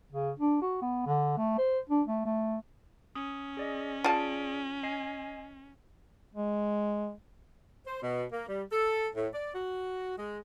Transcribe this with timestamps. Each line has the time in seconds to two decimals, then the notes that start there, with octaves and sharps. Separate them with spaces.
0.12 C#3
0.39 D4
0.61 F#4
0.82 B3
1.06 D3
1.37 A3
1.58 C5
1.90 D4
2.07 A3
2.25 A3
3.15 C#4 D#6
3.57 G#4 D5 D#5
4.04 F4 G#4 D5 A5 D7
4.83 D#5 G#5 C7
6.35 G#3
7.86 C5
8.02 B2
8.33 A#3
8.47 G3
8.71 A4
9.15 A2
9.34 D5
9.55 F#4
10.18 G#3